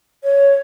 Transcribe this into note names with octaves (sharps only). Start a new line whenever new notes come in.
C#5